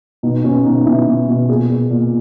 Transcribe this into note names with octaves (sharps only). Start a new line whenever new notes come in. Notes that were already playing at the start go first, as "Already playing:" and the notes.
B2 D#4
B2 C#4
B2 D#4
B2 E4
B2
B2
A#2 G#4
A#2
A#2